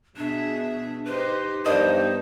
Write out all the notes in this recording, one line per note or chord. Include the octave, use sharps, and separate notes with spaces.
B2 D4 G#4 E5
D#4 G4 B4 C5
G2 E3 A#3 B3 D4 D#4 C5 D#5